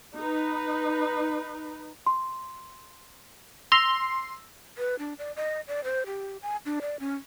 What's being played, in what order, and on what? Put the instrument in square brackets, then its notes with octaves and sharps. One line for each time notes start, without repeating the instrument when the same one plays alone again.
[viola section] D#4 B4
[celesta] C6
[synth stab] C6 [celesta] E6 A#6 F7
[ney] B4
D4
D5
D#5
D5
C5
G4
G#5
D4
D5
C#4